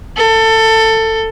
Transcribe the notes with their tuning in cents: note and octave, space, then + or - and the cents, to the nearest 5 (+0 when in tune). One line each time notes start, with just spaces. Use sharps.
A4 +20